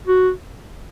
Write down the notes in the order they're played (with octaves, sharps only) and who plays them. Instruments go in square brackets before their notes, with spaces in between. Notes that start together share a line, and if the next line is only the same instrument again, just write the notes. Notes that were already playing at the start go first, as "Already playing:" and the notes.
[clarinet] F#4